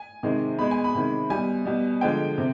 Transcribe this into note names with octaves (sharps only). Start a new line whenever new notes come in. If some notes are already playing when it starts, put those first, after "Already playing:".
Already playing: G#5
C3 D#3 G#3
B2 G#3 B5
G#5
B5
C3 D#3 G#3
B2 G3 G#5
B2 G3
D3 F3 G#3 G5
C3